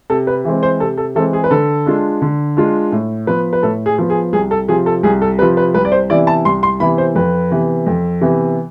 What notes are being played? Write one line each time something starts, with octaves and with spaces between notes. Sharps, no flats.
C3 A4
B4
E3 G#3 C4
C5
C3 A4
A4
E3 G#3 C4 A4
G#4
B4
D3 A4
G#3 D4 F4
D3
G#3 D4 F4
A2
F3 B3 B4
B4
A2 A4
G#4
F3 B3
G#4
C2 G#4
A4
C3 F3 G#4
A4
C2 G#4
A4
C3 F3 B4
B4
C2 B4
D5
C5
C3 E3 B3 E4 D5
A5
C2 C6
C6
C3 E3 B3 E4 B5
C5
F2 B4
C3 E3 B3
F2
C3 E3 B3